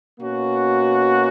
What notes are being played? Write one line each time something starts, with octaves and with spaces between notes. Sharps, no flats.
B2 A#3 C#4 F#4